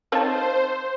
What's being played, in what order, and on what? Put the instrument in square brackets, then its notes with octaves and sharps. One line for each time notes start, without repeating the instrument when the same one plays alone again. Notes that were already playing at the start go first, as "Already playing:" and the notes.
[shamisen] C4 D#4 C#5 [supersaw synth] C5 [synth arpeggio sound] F5 A5